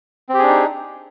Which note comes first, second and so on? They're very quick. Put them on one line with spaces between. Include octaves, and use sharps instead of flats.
C4 G4 G#4 D4 D#4